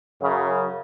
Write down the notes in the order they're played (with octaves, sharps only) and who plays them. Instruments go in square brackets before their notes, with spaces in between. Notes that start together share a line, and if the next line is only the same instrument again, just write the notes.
[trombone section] F#2 C#3